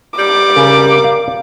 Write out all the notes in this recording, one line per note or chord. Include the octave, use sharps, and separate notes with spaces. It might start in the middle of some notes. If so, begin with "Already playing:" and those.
G3 D6
C#3 A#4
F5